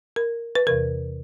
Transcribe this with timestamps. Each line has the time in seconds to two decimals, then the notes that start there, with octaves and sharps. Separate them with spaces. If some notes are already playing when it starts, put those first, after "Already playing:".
0.16 A#4
0.55 B4
0.67 E2 C3 E3 A#4